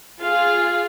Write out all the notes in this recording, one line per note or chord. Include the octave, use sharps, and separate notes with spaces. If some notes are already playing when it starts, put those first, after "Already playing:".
F4 G#4 F5